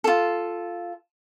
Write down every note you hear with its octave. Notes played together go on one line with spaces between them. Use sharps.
F4 A4